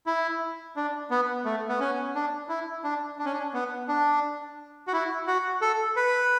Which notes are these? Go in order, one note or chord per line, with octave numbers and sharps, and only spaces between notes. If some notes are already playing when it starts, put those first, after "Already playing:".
E4
D4
B3
A3
B3
C#4
D4
E4
D4
D4
C#4
D4
B3
D4
F#4
E4
F#4
A4
B4